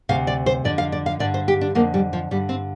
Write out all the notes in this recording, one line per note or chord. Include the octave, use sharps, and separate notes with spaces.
D2 C3 F5
D5
C5
F2 D3 D5
F5
D5
F5
G2 D3 D5
C5
G4
D4
F2 D3 A#3
G3
F3
G2 D3 G3
C4